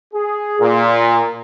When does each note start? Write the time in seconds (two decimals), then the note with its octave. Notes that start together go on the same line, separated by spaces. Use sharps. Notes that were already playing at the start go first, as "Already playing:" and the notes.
0.13 G#4
0.60 A#2